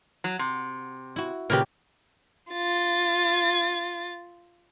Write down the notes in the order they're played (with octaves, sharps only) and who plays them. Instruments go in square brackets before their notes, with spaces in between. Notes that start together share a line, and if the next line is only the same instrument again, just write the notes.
[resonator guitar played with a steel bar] F#3
C3
[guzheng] E4 F#4
[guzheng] A#2 C#3 G4 [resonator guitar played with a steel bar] A#4 B4
[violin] F4 A6